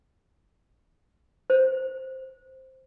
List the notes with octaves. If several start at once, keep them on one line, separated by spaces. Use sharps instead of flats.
C5